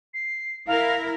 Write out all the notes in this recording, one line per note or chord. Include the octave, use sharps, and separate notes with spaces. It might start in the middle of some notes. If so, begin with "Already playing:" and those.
C7
E4 A#4 F5